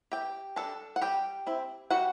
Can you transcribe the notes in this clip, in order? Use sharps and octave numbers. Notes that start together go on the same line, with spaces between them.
E3 G4 G5
G3 D4 A4 A5
F#5
G3 G4 G5
C4 E4
G3 F#4 F#5